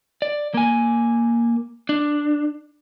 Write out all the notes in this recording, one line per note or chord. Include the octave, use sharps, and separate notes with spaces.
D5
A#3 G#5
D4